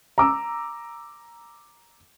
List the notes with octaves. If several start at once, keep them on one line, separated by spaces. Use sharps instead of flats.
A#5 D6 E6